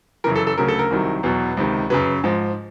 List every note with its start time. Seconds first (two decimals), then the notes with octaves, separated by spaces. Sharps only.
0.24 F#2 C#3 E3 A#4
0.36 A4
0.47 A4
0.58 D2 C#3 F#3 A#4
0.68 A4
0.79 A#4
0.91 C2 C3 D#3 F#3
1.23 E2 B2 F#3
1.57 C#2 C3 D#3
1.90 F#2 C#3 F#3 B4
2.24 G#2 F3